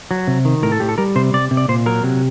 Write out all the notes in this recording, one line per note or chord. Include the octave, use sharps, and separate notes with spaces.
F#3
C3
D#3
A2 A#4
A4
A2 G4
A4
G3 A#4
C3 C5
C3 D5
C3
D5
A#2 C5
F#3 A#4
C3